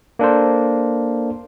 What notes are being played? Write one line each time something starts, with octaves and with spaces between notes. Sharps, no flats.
A#3 D4 A4 C5